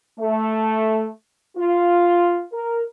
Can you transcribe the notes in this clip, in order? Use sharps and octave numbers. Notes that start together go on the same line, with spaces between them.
A3
F4
A#4